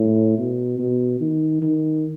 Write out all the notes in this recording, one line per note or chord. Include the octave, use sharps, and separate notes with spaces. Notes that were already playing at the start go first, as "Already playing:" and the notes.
Already playing: A2
B2
B2
D#3
D#3